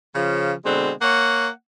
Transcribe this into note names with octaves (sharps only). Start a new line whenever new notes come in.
C#3 F3
B2 D3 G#3 C4
A#3 C#5 F#5